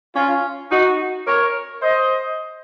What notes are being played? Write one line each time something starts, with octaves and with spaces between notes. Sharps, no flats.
C#4 F4
D#4 F#4
A#4 C#5
C5 D#5